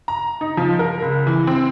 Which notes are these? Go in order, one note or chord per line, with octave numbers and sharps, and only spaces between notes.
A#5
D#4
F3
A#4
C#2
E3
C4